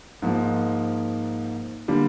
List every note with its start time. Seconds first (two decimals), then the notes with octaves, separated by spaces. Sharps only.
0.22 G#2 F3 A#3 D#4
1.88 D3 G3 A#3